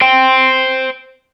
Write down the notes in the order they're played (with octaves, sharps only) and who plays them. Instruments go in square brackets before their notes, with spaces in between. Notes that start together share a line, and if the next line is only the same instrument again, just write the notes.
[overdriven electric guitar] C5 G5